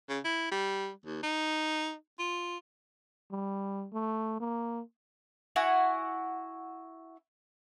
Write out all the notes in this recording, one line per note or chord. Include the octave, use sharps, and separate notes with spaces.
C#3
E4
G3
D#2
D#4
F4
G3
A3
A#3
E4 F#4 F#5 G#5